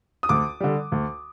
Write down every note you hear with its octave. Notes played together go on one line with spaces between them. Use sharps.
D#6
D2 D6
D3 G3
D2